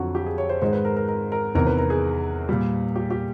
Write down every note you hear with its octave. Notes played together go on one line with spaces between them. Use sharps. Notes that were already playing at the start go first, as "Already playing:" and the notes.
Already playing: F2 D3 F#3 F4 F#4
G4
G#4
C#5
C5
G#2 D#3 G#3 C5
B4
A#4
A#4
A#4
A#4
E2 C3 D#3 A#4
B4
A#4
G#4
A#2 G3
G4
G4